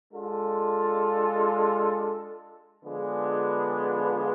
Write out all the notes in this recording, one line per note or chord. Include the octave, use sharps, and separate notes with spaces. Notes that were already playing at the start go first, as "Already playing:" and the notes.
G#3 D4 F4 A4
D3 F3 G#3 B3 D4